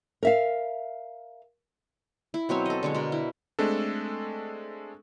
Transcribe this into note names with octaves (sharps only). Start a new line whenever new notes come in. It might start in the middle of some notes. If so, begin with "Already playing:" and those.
A#4 E5 F5
E4
B2 F#3 C4 C#5
A4 D#5
D3 G#3 C#5
B2 A#4
E4
G#3 A3 C4 D4 A4